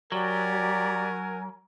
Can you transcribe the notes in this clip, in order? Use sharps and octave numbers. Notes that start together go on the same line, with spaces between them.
F#3 F#4 G4 A#4 D5 G#5